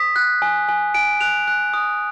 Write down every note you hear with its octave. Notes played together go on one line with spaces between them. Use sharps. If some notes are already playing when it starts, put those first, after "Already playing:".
Already playing: D#6 B6
F#6
G#5
G#5
G#5 D7
F#6 F7
F#6
D#6